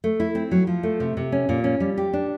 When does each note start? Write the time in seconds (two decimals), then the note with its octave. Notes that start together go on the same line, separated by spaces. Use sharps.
0.04 A3
0.20 E4
0.35 C4
0.51 F#3
0.67 F3
0.83 A3
1.00 C3
1.17 C3
1.32 C#4
1.49 A#2
1.64 C#4
1.80 G3
1.98 G4
2.13 D4